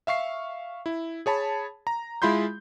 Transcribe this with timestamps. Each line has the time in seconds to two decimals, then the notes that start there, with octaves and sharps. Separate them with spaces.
0.07 E5 F5 C#6 C7
0.86 E4
1.26 G#4 C#5 A5 B5
1.87 A#5
2.22 G#3 E4 F4 B5 C6 G6